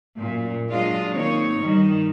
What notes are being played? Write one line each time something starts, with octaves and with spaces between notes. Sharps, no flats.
F#2 A#2
F#3 G#3 D4 F4 D#5
D#3 A#3 C4 D#4 C#5
G2 D#3 G3